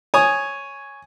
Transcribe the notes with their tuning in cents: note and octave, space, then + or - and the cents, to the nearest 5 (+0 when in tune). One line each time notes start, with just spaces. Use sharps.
C#5 +0 G#5 +0 D#6 -10